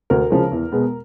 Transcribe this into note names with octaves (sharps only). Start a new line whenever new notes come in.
D2 A#4
C#3 F3 G#3
E2
B2 G#3 B3